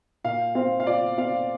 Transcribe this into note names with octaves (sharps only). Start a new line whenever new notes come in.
A#2 F5
C4 F5
F5
F4 D5
C4 F5